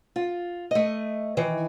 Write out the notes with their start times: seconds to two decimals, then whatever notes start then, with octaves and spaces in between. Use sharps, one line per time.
0.16 F4
0.71 A3 D#5
1.37 D#3 E3